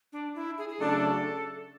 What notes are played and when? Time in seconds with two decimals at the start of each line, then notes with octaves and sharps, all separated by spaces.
0.12 D4
0.35 E4
0.58 G#4
0.69 G#4
0.80 C#3 F#3 A3 D4 A4